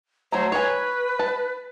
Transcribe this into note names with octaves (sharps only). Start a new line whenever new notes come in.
F#3 A3 C5 A#5
B4 C#5 G#5
A5